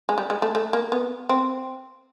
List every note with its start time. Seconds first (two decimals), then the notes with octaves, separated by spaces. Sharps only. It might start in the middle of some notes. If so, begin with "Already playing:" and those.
0.09 G#3
0.18 G3
0.30 G#3
0.42 A3
0.55 A3
0.73 A#3
0.92 B3
1.29 C4